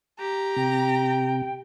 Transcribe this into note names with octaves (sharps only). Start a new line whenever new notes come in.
G4 A#5
C3 G5